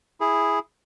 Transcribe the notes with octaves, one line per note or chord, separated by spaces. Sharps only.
E4 G#4